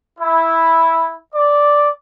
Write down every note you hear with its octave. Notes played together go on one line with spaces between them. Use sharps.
E4
D5